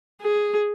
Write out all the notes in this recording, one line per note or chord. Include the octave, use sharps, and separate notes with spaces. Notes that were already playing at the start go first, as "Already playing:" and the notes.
G#4